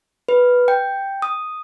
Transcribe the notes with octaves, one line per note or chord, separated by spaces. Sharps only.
B4
G5
D#6